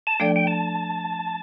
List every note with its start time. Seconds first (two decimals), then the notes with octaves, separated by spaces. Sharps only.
0.07 A5
0.20 F3 A3 D4 A4 D5 G5
0.36 G5
0.47 A5